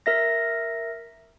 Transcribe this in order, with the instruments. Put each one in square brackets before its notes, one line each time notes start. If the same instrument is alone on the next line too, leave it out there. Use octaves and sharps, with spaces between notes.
[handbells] A#4 E5 A#6